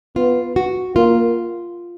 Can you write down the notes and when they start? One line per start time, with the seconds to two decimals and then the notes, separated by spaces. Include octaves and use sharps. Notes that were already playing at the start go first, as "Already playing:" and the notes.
0.16 B3 F4
0.56 F#4
0.96 A#3 F4